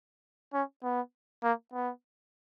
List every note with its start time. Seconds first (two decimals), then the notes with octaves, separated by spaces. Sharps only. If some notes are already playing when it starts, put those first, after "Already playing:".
0.54 C#4
0.83 B3
1.43 A#3
1.73 B3